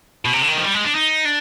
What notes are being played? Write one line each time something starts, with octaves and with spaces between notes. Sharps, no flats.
B2
C3
D3
D#3
F3
G3
G#3
D4
D#4
D4